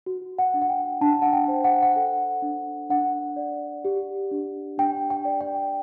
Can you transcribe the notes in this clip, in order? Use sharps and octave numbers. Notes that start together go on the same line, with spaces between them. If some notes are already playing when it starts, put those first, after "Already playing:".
F#4
F#5
D4
F#5
G5
D4 A5
F#5
G5
C5
F#5
F#5
A4
D4
D4 F#5
D5
G4
D4
D4 G5
G5
D5
G5